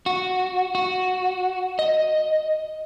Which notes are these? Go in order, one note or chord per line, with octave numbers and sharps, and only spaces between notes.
F#4
F#4
D#5